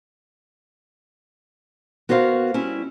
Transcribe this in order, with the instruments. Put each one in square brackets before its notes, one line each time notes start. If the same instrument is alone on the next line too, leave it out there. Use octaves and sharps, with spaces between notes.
[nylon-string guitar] B3 F#4 A#4 C5 D#5 F5
G3 C#4 E4